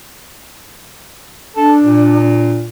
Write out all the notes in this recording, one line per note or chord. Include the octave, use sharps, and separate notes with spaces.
D4 A4
A#2